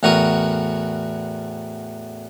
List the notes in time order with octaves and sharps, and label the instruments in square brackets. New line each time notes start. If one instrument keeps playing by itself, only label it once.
[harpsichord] E2 A2 F#4 A#4 C#6 D#6